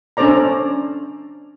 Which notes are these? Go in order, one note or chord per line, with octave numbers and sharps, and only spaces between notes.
C#4 D4 A4 C5 D5 A#5